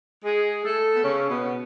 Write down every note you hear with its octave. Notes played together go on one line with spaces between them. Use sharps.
G#3 G#4
A3 A4
B3
C#3 C#4
B2 B3